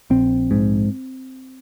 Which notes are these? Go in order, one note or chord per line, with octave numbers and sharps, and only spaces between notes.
A#1 C4
G#2